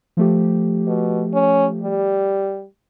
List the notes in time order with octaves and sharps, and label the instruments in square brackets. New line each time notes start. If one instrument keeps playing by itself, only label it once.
[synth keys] F3 A3 G4
[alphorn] B2
C#4
G3